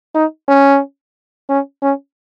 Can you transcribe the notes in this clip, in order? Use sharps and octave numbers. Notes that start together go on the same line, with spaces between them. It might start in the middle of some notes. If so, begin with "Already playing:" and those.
D#4
C#4
C#4
C#4